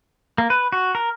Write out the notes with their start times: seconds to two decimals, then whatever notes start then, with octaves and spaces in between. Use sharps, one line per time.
0.38 A#3
0.50 B4
0.72 F#4
0.95 A#4